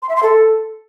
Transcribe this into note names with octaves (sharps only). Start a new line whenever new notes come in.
C6
E5
C6
A4